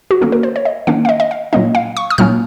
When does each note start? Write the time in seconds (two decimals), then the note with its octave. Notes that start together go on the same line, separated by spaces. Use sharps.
0.11 F#4
0.21 D#3 A#3 C#4 A4
0.32 A#4
0.43 C5
0.56 C#5
0.65 D#5
0.87 D#3 A#3 C#4 F5
1.05 F5
1.09 D#5
1.20 D#5
1.31 F5
1.53 A#2 F#3 A#3 C#4 D#5
1.75 F5
1.97 C#6
2.10 D#6
2.18 A#2 F#3 A#3 C#4 F6